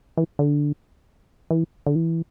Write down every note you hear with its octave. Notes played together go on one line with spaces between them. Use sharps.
E3
D3
E3
D3
E3